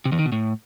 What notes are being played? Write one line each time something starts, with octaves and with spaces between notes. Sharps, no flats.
C3
E2
D#3
B2
A2